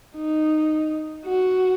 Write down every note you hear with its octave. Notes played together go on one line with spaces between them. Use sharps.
D#4
F#4